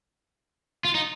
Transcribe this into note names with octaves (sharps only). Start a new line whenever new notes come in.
F4
D#4